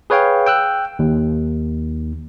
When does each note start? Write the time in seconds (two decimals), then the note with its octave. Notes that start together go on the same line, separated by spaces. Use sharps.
0.10 G#4 B4 C#5 F5 G5
0.46 G5 E6 F#6
0.99 D#2